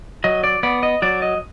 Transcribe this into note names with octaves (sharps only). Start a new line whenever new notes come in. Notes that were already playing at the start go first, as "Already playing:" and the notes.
F#3 D#5
D5
B3 D5
D#5
F#3 D5
D#5